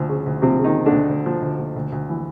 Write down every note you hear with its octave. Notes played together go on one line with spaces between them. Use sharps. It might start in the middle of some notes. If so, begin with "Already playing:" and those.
Already playing: D2 F3
C#3
D2
C3 F3 C4
C#3
D#3 D#4
F3
D3 D4
D2
D2
F3
D2
F3
D2
D2
E3